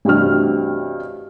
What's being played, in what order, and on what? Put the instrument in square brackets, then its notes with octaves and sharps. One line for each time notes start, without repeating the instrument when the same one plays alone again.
[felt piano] A1 G2 C3 F#4 F6